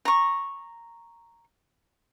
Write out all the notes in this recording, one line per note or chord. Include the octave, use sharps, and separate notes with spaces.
A#5 C#6